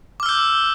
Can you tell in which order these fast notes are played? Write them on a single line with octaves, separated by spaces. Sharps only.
D6 F6 E6 G6